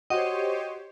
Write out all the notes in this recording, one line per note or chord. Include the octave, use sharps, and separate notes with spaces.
F#4 G4 C5 C#5 D#5